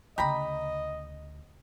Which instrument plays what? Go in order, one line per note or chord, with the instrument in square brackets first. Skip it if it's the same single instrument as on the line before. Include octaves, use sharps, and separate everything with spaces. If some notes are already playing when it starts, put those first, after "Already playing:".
[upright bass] D2 C#3 [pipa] G4 A#5 B5 [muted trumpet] D#5